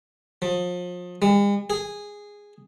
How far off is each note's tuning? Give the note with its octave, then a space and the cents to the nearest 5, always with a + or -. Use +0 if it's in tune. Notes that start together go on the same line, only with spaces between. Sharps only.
F3 +35
G#3 -45
G#4 -10